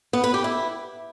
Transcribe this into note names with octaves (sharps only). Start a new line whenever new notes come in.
B3
B4
G4
E4